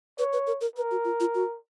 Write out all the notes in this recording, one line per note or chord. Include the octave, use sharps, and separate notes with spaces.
B4 C#5
B4
A#4
A#4
A#4 B4
F#4
F4
F4
F#4